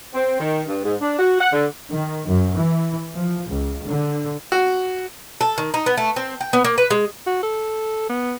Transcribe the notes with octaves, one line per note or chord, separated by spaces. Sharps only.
C4
D#3
G2
G#2
D4
F#4
F#5
D3
D#3
F#2
E3
F3
C#2
D3
F#4
A4
D#3
D#4
B3
A3
C4
G5
B3
A#3
B4
G#3
F#4
A4
B3